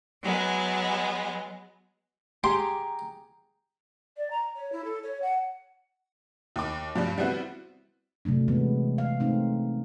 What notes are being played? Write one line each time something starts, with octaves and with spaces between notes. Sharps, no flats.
F#3 G#3 B3
G4 G#4 G5 A#5 C6 D6
D5
A#5
C#5
E4
A4
C#5
F#5
D#2 D6
G2 F3 G3
G3 B3 C4 E4 F#4
C3 F#3 A3 D4
E3 G#3 B3
F5
A3 C4 D#4